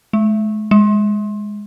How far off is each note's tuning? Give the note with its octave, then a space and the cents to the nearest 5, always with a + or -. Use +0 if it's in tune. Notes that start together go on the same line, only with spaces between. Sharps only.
G#3 +45
G#3 -5